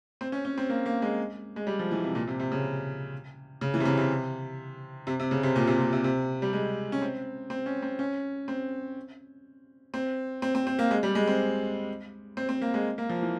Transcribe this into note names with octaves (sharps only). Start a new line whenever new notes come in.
C4
C#4
C#4
C4
A#3
A#3
G#3
G#3
G3
F3
E3
C3
A#2
C3
C3
C#3
C#3
E3
C3
C#3
C3
C3
C3
C#3
C3
A#2
C3
A#2
C3
C3
G3
G#3
C#4
C4
C4
C#4
C4
C#4
C4
C4
C4
C4
C4
A#3
G#3
G3
G#3
C4
C4
C4
A#3
G#3
A#3
F3
E3